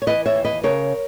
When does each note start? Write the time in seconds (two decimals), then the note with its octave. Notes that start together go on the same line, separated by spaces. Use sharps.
0.02 C#5
0.06 E3 B4 D#5
0.26 C#5 E5
0.35 D#2
0.45 B4 D#5
0.63 C#3 A#4 C#5